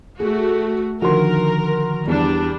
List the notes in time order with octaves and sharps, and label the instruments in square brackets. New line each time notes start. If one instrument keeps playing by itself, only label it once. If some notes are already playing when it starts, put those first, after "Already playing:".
[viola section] A3 F#4 [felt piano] G#4
[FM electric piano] D3 D#3 F3 [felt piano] F#4 C6 [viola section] A#4
[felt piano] E2 [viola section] G3 D4